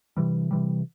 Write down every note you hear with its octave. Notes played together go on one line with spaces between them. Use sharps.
C3 E3 G3
C3 E3 G3